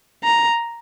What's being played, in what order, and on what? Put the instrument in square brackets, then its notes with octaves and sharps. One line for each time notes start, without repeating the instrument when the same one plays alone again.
[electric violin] A#5